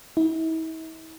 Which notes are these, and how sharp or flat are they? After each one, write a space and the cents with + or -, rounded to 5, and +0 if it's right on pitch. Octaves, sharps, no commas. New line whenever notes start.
E4 -40